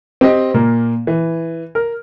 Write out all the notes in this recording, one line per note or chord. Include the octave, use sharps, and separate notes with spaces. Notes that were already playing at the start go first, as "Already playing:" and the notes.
C4 G4 D#5
A#2 A#3
E3
A#4